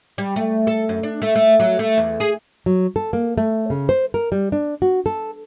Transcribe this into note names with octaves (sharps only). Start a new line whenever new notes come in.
G3
A3
A4
F#2
D4
A3
A3
F#3
A3
E2
G#4
F#3
A4
A#3
A3
C#3
C5
A#4
G3
D4
F#4
A4